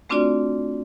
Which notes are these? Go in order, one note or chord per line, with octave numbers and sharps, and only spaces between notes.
A3 C4 D4 F4 F#4 D5